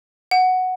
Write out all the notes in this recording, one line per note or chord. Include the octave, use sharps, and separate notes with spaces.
F#5